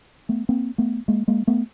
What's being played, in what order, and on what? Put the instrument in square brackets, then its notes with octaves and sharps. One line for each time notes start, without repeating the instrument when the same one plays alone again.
[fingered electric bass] A3 B3
A#3 C4
A3 B3
G#3 A#3
G#3 A#3
A3 B3